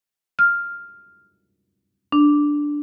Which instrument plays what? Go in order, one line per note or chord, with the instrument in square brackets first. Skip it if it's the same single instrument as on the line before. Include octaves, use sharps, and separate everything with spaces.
[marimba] F6
D4